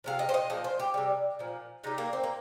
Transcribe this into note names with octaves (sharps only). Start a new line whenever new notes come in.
C3 F3 F5
D#5
C5
D#5
A#2 F3 D#5
C5
G4
C3 G3
A#2 F3
C3 G3 D#4
A#3
C4
A#3